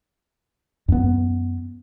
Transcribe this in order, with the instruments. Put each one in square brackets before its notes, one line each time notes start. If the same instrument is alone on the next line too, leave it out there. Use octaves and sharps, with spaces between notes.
[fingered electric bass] F#2 B3